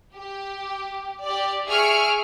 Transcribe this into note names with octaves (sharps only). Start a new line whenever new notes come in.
G4
G4 D5
G#4 E5 C#6 F6 D7